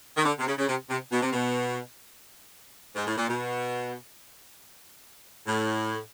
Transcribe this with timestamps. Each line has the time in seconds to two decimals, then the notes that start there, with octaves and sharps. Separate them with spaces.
0.17 D#3
0.25 D3
0.39 C3
0.47 C#3
0.58 C#3
0.68 C3
0.90 C3
1.12 B2
1.22 C3
1.33 B2
2.96 G#2
3.07 A2
3.17 A#2
3.29 B2
5.46 A2